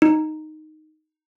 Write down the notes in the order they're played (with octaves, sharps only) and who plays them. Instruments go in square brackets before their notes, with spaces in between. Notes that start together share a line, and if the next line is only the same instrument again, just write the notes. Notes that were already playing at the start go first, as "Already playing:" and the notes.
[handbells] D#4